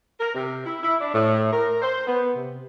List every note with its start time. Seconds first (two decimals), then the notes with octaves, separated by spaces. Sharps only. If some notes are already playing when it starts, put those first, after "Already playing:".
0.20 A#4
0.34 C3
0.66 E4
0.83 E4
1.00 D4
1.13 A2
1.53 A#4
1.82 C5
2.07 B3
2.36 C3